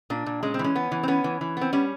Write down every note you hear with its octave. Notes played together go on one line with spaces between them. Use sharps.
A#2 D4
A#2
G#3 C#4
C4
E3
C#4
B3
E3
C4
B3 C#4
E3
E3
B3 C4
G3 C#4